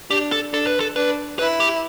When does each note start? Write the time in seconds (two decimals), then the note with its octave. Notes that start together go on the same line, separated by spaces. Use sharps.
0.10 D4 G4
0.32 A4
0.53 D4 A4
0.67 B4
0.80 A4
0.96 D4 B4
1.39 E4 B4
1.60 G4